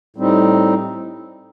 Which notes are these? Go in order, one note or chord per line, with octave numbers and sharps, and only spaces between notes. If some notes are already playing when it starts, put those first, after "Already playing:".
A2 G3 C4 D#4